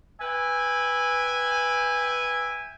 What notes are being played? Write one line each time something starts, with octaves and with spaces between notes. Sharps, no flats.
B4 E5 G5 G#5